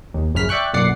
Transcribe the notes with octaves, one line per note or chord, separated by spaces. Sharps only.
D#2
A#1 F#2 C#3 F6 B6
D5 E5 G5 C#6 F#6
B1 F#2 A#2 D5 F#5 C7